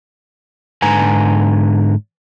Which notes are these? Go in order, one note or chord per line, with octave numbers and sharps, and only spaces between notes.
G#2 D3 B4 G#5 A#5